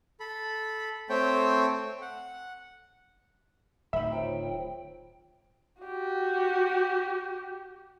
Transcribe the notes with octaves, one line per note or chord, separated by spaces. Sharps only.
A4 B5
A3 C4 C5 C#5 G5
F#5
D1 D#3 E5 A#5 B5
F4 C5 C#5 G5
F#4 G4